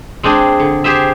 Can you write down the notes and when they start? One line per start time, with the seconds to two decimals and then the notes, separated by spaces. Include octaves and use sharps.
0.23 G#3 C4 D4 G#4
0.60 D3
0.84 G4 G#4 C5 E5